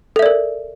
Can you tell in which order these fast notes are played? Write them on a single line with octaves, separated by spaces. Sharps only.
A4 E5 D5 A#4